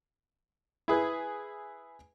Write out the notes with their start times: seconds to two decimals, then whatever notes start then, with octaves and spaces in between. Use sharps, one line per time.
0.88 E4 G#4 B4